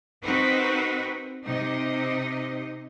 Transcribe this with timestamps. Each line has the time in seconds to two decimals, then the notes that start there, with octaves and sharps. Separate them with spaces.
0.24 C4 D#4 F#4 A#4 B4
1.46 C3 D#4 D#5